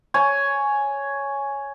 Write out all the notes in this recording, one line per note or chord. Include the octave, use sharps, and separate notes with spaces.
C#5 G#5